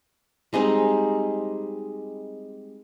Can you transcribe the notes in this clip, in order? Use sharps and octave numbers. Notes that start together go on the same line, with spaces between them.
G3 G#3 C4 D#4